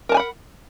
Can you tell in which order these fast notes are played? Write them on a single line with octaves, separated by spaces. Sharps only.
A#4 A5 G#5 B5 F#5